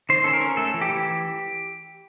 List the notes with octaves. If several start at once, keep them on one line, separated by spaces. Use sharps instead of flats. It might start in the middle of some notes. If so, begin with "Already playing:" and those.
D#3 C5
C#4 A4
A#4
C#4
A3 A4
E3
G4
E3